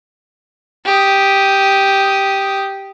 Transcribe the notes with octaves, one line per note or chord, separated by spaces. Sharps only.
G4 D#6